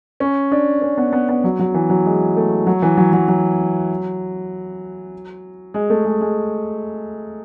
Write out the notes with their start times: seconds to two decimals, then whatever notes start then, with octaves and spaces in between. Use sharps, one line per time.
0.20 C#4
0.51 D4
0.82 C#4
0.97 B3
1.13 B3
1.29 B3
1.44 F#3
1.59 F#3
1.74 E3
1.90 F#3
2.05 G#3
2.37 A3
2.67 F#3
2.82 E3
2.97 F#3
3.13 F#3
3.28 F#3
5.74 G#3
5.90 A3
6.05 G#3
6.21 G#3